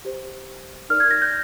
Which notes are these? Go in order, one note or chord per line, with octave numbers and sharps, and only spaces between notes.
G4 C5
D#4 A#4 D5 F6
G#6
A#6
G6